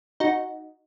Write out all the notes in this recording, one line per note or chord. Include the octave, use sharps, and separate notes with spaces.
D#4 F#4